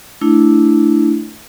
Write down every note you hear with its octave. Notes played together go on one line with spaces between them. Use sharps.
A3 D4 E4